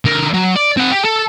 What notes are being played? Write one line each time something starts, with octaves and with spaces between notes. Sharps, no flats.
D3 A#4
F#3
D5
C4 F#5
G4
A4